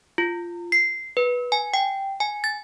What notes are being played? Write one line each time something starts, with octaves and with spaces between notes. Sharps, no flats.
F4
C7
B4
G#5
G5
G#5
A6